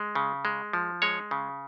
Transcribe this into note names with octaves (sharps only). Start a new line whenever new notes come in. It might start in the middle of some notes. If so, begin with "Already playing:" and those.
Already playing: G#3
C#3
G#3
F3
G#3 C#5
C#3